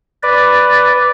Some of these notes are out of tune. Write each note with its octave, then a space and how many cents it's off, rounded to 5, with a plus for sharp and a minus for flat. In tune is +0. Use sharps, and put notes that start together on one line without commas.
B4 +5 D5 +0